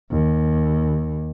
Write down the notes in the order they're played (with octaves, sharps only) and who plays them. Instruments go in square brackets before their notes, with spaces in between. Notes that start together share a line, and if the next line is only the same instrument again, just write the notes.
[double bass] D#2